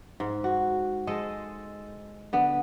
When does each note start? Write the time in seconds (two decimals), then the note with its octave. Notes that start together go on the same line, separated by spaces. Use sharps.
0.20 G#2
0.44 F#4
1.07 G#3 A4 C5 D#5
2.33 D3 B3